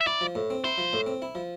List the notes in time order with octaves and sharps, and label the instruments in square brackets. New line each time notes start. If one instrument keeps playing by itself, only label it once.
[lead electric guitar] E5
[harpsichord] E4 [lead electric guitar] D5
[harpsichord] F3
A2
C4
[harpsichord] E4 [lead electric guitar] C5
[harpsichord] F3
A2
C4
E4
F3